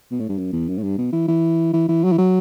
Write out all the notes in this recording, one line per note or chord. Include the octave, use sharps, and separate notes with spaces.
B2
A2
G2
F#2
E2
F#2
A2
G2
B2
E3
E3
E3
E3
F#3
E3
F#3